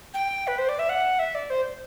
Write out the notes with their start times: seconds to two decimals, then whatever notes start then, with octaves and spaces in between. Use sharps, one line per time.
0.14 G5
0.47 B4
0.58 C5
0.69 D5
0.79 E5
0.89 F#5
1.19 E5
1.35 D5
1.50 C5